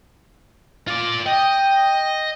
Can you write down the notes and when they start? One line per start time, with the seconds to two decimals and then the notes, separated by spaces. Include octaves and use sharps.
0.88 F4 D5
1.26 D#5 G5